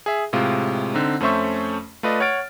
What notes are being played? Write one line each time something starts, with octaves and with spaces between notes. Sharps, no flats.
G#4 E5
A2 C3 G#3 F4
D3 C4 D#4
F2 A3 C#4 C5 E5 C#6
A3 F4 B4 D5 D#5
C#5 F#5 F6 A6 D7